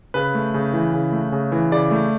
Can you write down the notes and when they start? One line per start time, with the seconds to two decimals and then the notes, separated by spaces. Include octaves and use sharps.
0.14 C#3 B4
0.35 A3
0.54 C#3
0.73 E3
0.93 C#3
1.12 A3
1.32 C#3
1.52 E3
1.71 C#3 D5
1.91 A3